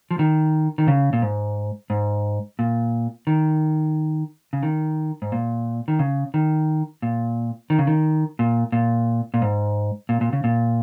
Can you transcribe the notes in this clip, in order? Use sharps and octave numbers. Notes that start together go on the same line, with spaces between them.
F3
D#3
D#3
C#3
A#2
G#2
G#2
A#2
D#3
C#3
D#3
G#2
A#2
D#3
C#3
D#3
A#2
D#3
C#3
D#3
A#2
A#2
A#2
G#2
A#2
A#2
C#3
A#2